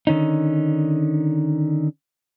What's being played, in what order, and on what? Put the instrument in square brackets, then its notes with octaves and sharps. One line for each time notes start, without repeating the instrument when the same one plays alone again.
[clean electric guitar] D3 D#3 C#4 D#4